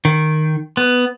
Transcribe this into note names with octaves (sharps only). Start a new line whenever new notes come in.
D#3
B3